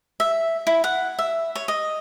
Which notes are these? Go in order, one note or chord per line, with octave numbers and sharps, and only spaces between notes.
E5
E4
F#5
E5
C#5
D#5